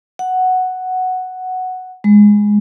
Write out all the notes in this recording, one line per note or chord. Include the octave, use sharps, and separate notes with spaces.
F#5
G#3